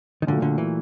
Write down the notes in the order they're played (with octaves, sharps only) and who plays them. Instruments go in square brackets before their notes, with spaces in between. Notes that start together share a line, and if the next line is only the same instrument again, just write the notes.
[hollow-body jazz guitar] D#3
[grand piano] A#2 F#3 A3 [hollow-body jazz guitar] D3
[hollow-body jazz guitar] D3
E3